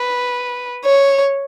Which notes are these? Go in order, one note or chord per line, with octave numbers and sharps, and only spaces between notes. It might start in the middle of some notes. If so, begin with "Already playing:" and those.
Already playing: B4
C#5